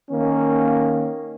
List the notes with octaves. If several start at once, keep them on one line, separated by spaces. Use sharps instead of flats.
D#3 A#3 C#4